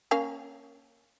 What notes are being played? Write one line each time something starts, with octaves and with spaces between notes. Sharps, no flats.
A#3 C#4 F5